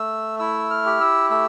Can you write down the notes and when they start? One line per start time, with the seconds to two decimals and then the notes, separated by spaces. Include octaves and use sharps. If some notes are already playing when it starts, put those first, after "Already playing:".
Already playing: A3 E6
0.39 E4 E6
0.70 F6
0.86 G4
1.01 E6
1.30 A3 E6